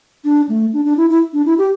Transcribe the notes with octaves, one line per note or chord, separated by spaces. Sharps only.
D4
A3
D4
D4
E4
E4
D4
E4
G4